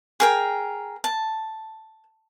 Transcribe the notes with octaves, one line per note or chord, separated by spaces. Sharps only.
G#4 A#4 G5
A5